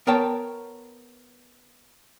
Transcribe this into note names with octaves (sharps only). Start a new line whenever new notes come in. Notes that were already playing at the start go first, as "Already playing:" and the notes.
B3 A#4 C#5 G5 A5